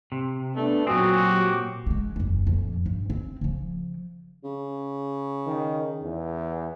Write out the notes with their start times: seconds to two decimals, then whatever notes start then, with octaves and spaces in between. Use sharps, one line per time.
0.12 C3
0.56 A3 B3 D4
0.87 A#2 F#3 C4 F#4 G#4
1.25 G4
1.87 G#3 A3
2.16 F#1 E2
2.47 F2 A#2
2.86 G2
3.10 C4
3.41 C#3 F3
4.44 C#3
5.46 D#3
6.02 E2